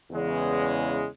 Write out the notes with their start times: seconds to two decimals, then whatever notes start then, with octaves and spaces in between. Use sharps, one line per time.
0.11 E2 C#3 G#3